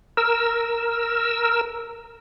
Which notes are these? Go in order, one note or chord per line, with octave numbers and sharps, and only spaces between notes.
A#4 E6